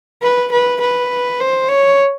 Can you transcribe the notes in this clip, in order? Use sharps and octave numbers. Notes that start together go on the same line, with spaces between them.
B4
B4
B4
C5
C#5